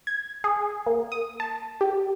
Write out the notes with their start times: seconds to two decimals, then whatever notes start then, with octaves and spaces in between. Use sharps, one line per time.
0.07 G#6
0.44 G#4
0.87 A#3
1.12 D#6
1.40 A5
1.81 G4